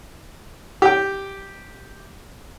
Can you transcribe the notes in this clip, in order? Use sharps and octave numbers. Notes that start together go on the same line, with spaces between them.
G4 G5